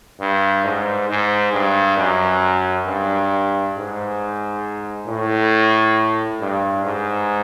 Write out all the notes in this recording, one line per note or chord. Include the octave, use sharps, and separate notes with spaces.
G2
G#2
G#2
G2
F#2
G2
G#2
A2
G2
G#2